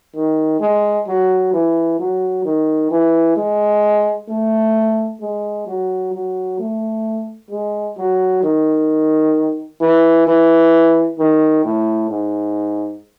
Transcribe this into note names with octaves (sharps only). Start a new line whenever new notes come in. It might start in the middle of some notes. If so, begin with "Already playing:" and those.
D#3
G#3
F#3
E3
F#3
D#3
E3
G#3
A3
G#3
F#3
F#3
A3
G#3
F#3
D#3
E3
E3
D#3
A2
G#2